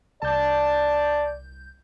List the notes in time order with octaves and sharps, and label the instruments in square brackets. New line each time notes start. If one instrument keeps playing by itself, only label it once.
[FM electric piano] C2 G6 [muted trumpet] D5 [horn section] A5